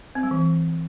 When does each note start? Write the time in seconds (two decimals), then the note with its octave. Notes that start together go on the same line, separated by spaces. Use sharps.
0.15 C4
0.23 G3
0.31 E3